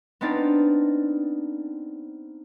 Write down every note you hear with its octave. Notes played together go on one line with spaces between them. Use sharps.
B3 C4 D4 D#4 F4 D5